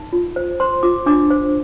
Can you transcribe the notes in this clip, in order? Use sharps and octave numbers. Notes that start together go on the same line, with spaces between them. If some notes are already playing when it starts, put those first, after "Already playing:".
Already playing: D#4
F4
C5
C5 C6
F4 D6
D4 D6
C5